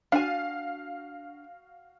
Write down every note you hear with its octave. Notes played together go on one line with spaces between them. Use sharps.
D4 F#4 F5 G#5